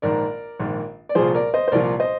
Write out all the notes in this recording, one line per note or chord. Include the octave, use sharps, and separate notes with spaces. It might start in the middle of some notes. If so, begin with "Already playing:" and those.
A#1 G#2 D#3 A#4 D5
A#1 G#2 D#3
D5
C2 A#2 F3 G#4 C5
A#4 D5
C5 D#5
C5
C2 A#2 F3 A#4 D5
C5 D#5